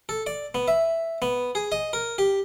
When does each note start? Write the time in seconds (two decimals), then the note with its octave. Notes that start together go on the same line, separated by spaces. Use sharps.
0.09 A4
0.27 D5
0.55 B3
0.68 E5
1.22 B3
1.55 G#4
1.72 D#5
1.93 A#4
2.18 G4